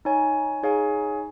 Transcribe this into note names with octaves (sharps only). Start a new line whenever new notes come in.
D#4 C#5 G#5
D#4 G#4 C#5 F5 G#5